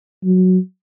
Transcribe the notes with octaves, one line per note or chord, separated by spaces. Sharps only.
F#3